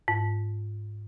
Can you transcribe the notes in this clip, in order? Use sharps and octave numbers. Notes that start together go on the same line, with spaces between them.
G#2